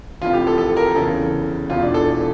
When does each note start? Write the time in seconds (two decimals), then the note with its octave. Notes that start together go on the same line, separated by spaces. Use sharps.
0.21 F1 F2 E3 F4
0.33 G4
0.47 A4
0.58 A4
0.77 A#4
0.95 E2 C#3 E3 A4
1.70 E1 E2 E3 F4
1.82 D4
1.94 A4